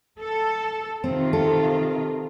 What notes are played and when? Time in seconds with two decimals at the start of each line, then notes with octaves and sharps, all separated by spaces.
0.18 A4
1.04 C3 D#3 C4 F4
1.33 A4